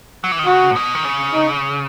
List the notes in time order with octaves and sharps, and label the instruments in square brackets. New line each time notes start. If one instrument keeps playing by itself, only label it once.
[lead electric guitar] F#3
E3
D#3
[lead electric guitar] C#3 [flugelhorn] F#4
[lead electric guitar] A2
B2
D#3
C#3
[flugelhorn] D#4